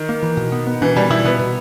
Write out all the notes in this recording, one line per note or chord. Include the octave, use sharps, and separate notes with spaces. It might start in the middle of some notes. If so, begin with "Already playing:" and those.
Already playing: D#3
A#3
E3
B2
B3
B3
B2 E3
B2 G3
B2 E4
B2 B3
B2